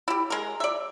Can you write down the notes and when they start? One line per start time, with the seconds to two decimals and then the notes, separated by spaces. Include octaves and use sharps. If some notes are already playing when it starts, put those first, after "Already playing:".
0.08 E4 G4
0.30 G#3 A#4
0.60 D5 E5